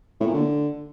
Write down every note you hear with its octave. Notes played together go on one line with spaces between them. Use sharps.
A2
A#2
D3